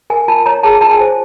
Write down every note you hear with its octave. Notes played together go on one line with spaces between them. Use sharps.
A#4 G#5
F4 A5
C#5 A#5
G#4 A5
F4 A5
G#5
C5